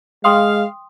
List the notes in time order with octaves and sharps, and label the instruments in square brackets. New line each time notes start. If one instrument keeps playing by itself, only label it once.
[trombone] G#3 [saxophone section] F5 [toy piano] G5 C6 D#6